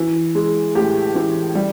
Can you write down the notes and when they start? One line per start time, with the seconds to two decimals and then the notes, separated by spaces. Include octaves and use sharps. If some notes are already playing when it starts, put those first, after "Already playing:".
Already playing: E3
0.35 G#3
0.75 A2 G4
1.15 E3
1.55 G3